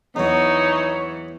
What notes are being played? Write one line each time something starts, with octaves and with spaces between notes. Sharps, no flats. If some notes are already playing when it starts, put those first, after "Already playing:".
E2 E3 F#3 D#4 C#5